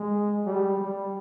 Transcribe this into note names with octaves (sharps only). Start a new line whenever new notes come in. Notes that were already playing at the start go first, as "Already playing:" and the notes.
Already playing: G#3
G3
G3